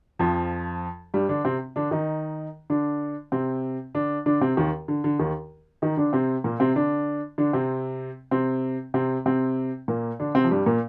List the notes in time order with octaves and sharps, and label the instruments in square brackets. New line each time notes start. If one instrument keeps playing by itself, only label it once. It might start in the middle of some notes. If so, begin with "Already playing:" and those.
[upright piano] F2 F3
G2 G3
D3 D4
C3 C4
D3 D4
D#3 D#4
D3 D4
C3 C4
D3 D4
D3 D4
C3 C4
D#2 D#3
D3
D3
D#2 D#3
D#3 D#4
D3 D4
C3 C4
A#2 A#3
C3 C4
D3 D4
D3 D4
C3 C4
C3 C4
C3 C4
C3 C4
A#2 A#3
D3 D4
C3 C4
F3
G2 G3
A#2 A#3